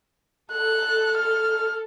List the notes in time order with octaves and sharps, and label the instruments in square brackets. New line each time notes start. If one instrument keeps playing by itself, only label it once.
[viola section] A4 [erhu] F#6
[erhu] F6